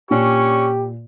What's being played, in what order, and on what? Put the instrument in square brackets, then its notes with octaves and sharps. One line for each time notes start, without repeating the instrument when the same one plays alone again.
[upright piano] A#2 [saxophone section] C#4 D4 [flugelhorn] G4 [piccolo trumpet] C#6